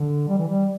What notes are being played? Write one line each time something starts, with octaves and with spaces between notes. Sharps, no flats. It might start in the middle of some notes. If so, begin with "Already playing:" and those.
Already playing: D3
G3
E3
G3